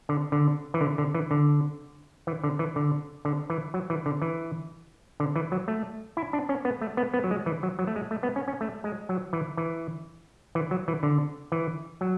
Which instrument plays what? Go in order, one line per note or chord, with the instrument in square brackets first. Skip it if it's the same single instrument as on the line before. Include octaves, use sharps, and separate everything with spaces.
[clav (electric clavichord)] D3
D3
E3
D3
D3
E3
D3
E3
D3
E3
D3
D3
E3
F#3
E3
D3
E3
D3
E3
F#3
A3
E4
D4
C#4
B3
A3
B3
B3
F#3
G#3
E3
F#3
F#3
A3
G#3
A3
B3
C#4
C#4
A3
G#3
F#3
E3
E3
E3
F#3
E3
D3
E3
F#3